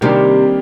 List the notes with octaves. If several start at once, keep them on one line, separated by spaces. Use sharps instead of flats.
C3 D#3 G3 A#3 D4 G4